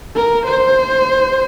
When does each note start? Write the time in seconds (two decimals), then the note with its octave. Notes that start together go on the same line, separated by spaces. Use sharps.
0.16 A#4
0.45 C5